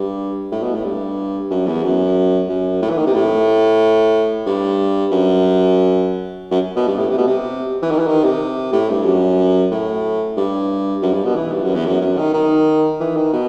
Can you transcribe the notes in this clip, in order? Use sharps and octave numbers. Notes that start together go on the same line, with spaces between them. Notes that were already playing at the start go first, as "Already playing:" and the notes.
Already playing: G2
A2
B2
A2
G2
F#2
E2
F#2
F#2
A2
E3
D#3
C3
A2
G2
F#2
F#2
B2
G2
A2
C3
B2
C3
E3
D#3
E3
D#3
C3
A2
G2
F#2
A2
G2
F#2
G2
B2
E3
G2
F#2
E2
F#2
F#2
D#3
D#3
E3
D#3
B2